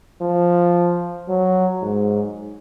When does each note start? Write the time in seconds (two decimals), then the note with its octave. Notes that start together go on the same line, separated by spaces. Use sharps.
0.21 F3
1.29 F#3
1.82 G#2